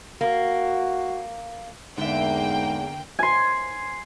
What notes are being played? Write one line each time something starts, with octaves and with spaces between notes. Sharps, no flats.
A#3 F#4
E2 G#2 D3 A#3 E5 G5
G#5 C6